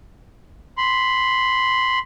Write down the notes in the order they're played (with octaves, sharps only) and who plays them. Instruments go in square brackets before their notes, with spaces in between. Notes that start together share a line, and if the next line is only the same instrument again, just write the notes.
[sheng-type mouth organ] B5 C6